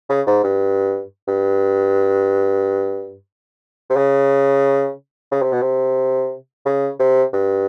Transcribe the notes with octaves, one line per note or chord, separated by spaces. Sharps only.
C#3
G#2
G2
G2
C3
C#3
C#3
C3
B2
C3
C#3
C3
G2